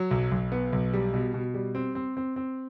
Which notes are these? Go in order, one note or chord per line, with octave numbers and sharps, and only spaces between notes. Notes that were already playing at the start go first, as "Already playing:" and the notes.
Already playing: F#3
B1
B1
B3
B1
G3
B2
B2
G3
C4
C4
C4
C4